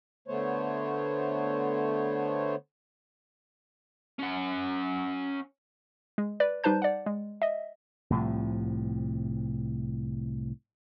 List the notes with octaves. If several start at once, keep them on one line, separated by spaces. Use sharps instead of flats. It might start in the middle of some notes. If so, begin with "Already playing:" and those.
D3 A3 B3 C5 C#5
C#4 F#5
G#3
B4 D5
G3 D#4 B4 C5 A5 G6
D5 F#5
G#3
D#5 E5
C2 A2 C3 F3